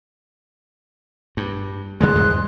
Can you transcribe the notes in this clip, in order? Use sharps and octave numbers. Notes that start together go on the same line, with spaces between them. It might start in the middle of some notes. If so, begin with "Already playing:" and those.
G2
C#3 G3 G#3 G#4 C6 F#6
E2 G#2